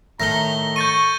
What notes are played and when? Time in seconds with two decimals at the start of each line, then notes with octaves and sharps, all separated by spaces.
0.20 A2 D#3 A3 A#5 A#6 G7
0.76 C#6 G6 A6 D#7